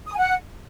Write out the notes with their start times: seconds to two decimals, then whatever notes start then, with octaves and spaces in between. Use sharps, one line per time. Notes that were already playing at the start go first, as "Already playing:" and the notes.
0.08 D#6
0.13 G#5
0.19 F#5